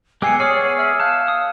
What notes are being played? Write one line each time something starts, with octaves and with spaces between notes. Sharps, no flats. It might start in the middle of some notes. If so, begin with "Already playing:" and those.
G#3 B3 G4 G#5 E6 C7 C#7
B3 G#4 C#5 D5 D#6 F6 C7
C#5
E5 E6 F6 G#6
F5 A5 F6 F#6
D#6